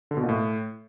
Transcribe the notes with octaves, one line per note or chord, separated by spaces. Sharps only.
D3
B2
A#2
A2